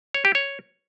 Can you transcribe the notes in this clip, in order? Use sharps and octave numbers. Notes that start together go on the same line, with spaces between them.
C#5
G4
C#5